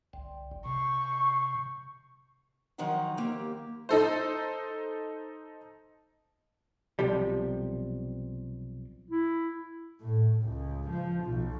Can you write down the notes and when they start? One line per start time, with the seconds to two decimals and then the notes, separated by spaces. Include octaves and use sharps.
0.13 G1 C2
0.66 C3 C#6
2.78 D#3 F3 F#3 D#4 F#5
3.17 D#2 A#3 G4
3.89 D#4 A4 C5
6.99 B1 C3 F3 G3
9.11 E4
10.01 A2
10.43 C#2
10.90 F3
11.25 B1